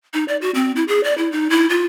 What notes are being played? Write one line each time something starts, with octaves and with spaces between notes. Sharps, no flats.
D#4
D5
F#4
C4
E4
G#4
D5
E4
D#4
E4
F4